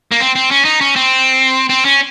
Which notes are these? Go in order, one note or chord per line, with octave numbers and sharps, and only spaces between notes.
A#3
C4
C4
C#4
D#4
C#4
C4
C4
C#4